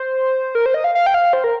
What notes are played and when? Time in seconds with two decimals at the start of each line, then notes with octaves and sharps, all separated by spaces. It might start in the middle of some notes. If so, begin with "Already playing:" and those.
Already playing: C5
0.55 A#4
0.66 C5
0.74 D#5
0.84 F5
0.95 F5
1.06 G5
1.14 F5
1.33 C5
1.44 A#4